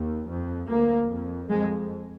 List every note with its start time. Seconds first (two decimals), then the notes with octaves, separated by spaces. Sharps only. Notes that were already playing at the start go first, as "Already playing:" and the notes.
Already playing: D#2
0.26 F2
0.68 D2 A#3
1.08 F2
1.49 F2 G#3